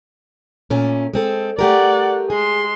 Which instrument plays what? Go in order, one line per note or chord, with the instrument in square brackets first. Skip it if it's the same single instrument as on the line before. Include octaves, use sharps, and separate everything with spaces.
[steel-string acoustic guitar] A#2 A3 C#4
G#3 C4 A4
[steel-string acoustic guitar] A3 G4 A#4 [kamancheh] D5 F#5
[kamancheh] G#3 C6 [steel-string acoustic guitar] G#4